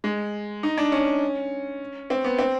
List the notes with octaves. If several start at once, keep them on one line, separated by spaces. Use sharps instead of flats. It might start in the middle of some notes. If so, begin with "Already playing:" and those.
G#3
D#4
D4
C#4
C4
B3
C4